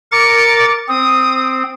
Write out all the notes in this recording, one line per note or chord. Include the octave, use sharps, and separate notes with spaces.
A#4 D6 A6 C#7
C4 D#6